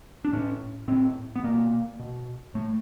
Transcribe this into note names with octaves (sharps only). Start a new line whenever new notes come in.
D4
A2 C#4
A2 C4
B3
B2 A#3
B2
A2 A3